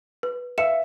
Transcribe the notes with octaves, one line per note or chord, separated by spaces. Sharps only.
B4
B4 E5 F5 E6 C#7 E7